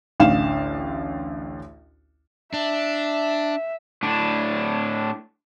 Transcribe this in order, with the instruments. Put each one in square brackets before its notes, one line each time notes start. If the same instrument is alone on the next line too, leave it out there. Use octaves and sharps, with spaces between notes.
[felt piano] A1 D2 F5 E7
[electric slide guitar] D4 [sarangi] E5
[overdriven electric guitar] A2 D4